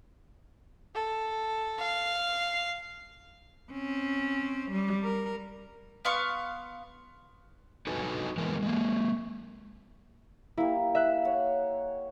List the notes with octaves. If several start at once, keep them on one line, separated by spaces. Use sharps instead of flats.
A4
F5
C4 C#4
G3
A#4
B3 F5 C6 C#6
D#4 F#4 A4 B4 G#5
E3 G#3 B3 A#4
G#3 A#3
A#3 E4 G4
E5 F#6
C#5 F#5